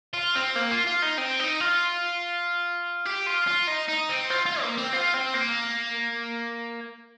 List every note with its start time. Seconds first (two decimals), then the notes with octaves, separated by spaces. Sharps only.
0.14 F4
0.35 C4
0.56 A#3
0.71 F4
0.87 F4
1.02 D#4
1.18 C4
1.40 D#4
1.60 F4
3.05 G4
3.26 F4
3.47 F4
3.67 D#4
3.88 D#4
4.09 C4
4.30 F4
4.46 F4
4.61 A#3
4.77 C4
4.93 F4
5.14 C4
5.34 A#3